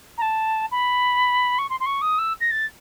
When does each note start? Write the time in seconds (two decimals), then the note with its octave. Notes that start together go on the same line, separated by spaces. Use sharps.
0.18 A#5
0.22 A5
0.72 B5
1.59 C#6
1.70 C6
1.80 C6
1.86 C#6
2.02 D#6
2.19 E6
2.41 A#6
2.51 A6